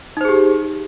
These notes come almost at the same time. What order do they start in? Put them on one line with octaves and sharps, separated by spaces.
D#4 C5 G#4 G4